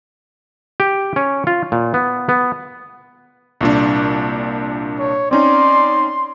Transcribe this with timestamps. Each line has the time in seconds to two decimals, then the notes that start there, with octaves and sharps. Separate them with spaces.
0.80 G4
1.16 C#4
1.47 F4
1.72 A#2
1.94 B3
2.29 B3
3.61 C2 A#2 D4
4.99 C#5
5.31 C4 C#4 D#4 D5 C6